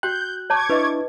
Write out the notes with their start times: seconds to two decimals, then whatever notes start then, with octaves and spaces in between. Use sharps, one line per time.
0.03 F#4 G5 F#6 G6
0.50 C#5 A5 C#6 D6 G#6
0.70 D4 E4 B4 D#5